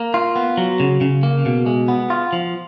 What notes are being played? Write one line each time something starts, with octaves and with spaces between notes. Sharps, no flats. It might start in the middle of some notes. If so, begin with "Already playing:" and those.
Already playing: A#3
F4
B3
F#3
C#3
C#3
A#3
B2
G#3
B3
F4
F3